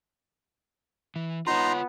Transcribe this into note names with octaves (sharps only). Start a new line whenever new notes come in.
E3
B3 D#4 F4 C#5 A#5 C6